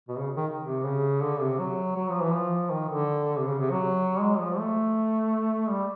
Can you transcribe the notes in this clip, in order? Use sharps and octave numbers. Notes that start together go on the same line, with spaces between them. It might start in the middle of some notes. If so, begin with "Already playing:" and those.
B2
C#3
D#3
C3
C#3
D3
C3
F#3
F#3
F3
E3
F3
D#3
D3
C3
C#3
C3
F#3
G#3
F3
A3
G3